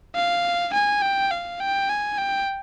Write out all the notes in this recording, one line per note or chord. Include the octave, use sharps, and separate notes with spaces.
F5
G#5
G5
F5
G5
G#5
G5